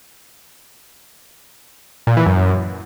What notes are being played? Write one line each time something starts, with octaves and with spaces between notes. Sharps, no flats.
A#2
E3
F#2